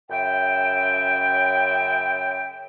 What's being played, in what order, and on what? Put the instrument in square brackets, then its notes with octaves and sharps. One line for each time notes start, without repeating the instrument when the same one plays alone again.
[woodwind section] F#2 C#3 E5 G5